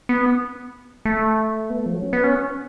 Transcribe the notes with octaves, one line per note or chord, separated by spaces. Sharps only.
B3
A3
B3
A3
F3
F#3
C#4
B3
C#4